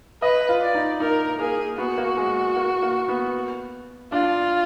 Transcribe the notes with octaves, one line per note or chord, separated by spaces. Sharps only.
B4 D#5
F4
D5
D#4
D#4 A#4
A#3 G#4
B3 F#4
A#3
G#3
A#3
A#3
B3
D4 F4